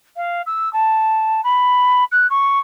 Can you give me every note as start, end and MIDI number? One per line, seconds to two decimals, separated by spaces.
0.16 0.42 77
0.46 0.71 88
0.73 1.41 81
1.44 2.04 83
2.12 2.27 90
2.30 2.59 85